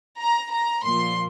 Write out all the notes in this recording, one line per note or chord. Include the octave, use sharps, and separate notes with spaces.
A#5
A#5
A#2 F3 C6